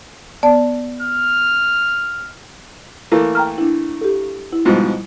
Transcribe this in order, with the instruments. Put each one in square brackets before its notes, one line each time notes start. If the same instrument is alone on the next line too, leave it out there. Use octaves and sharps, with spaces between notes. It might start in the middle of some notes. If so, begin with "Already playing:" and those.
[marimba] B3 D5 A5
[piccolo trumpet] F6
[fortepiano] E3 A3 A#3
[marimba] G5 A#5 F6
D4 E4
G4 A4
E4
[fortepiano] G#2 B2 F3 [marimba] G3